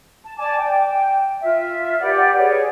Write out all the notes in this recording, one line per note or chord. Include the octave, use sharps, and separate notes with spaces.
A5
D5 G#5 A5 D6
G5
F4 E5
G4 B4 D5 F#5
G#4 C#5 F#5